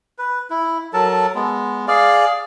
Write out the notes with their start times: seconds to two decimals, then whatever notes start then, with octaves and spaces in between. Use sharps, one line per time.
0.18 B4
0.50 E4
0.93 F#3 A4 A#4 A5
1.35 G#3 B3
1.88 G#4 D5 F5